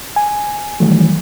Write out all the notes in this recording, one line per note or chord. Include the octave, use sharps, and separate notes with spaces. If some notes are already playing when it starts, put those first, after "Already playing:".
G#5
D#3 E3 F#3 G3 A3